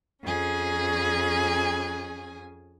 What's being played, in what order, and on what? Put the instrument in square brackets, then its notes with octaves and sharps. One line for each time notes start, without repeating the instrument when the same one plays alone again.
[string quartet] F2 C#4 G#4 G#5